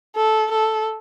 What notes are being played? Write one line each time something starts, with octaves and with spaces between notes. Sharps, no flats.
A4
A4